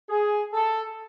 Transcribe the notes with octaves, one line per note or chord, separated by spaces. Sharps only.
G#4
A4